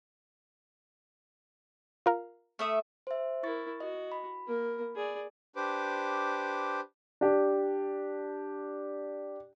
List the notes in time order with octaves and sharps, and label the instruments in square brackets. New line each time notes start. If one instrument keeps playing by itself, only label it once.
[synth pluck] F4 A#4 F5
[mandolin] A3 E5 D#6
[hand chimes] C5 E5
[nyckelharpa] E4 A#4 [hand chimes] C#6 A6
[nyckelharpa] F#4 [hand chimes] D#5
[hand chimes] B5
[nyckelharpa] A#3 A#4
G#4 D5
[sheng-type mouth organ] D4 G4 B4 C5 D6
[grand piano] D4 G4